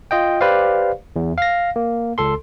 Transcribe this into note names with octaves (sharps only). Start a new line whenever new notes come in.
F4 D#5 G5
G4 B4 C5 D5 F5
E2
F5 A#6
A#3
C#2 A4 C6